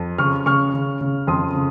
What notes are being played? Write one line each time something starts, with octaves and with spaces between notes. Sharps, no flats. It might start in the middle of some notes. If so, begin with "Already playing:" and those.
Already playing: F2
C#3 C#6 F6
C#3 C#6 F6
C#3
C#3
F2 C6 D#6
C#3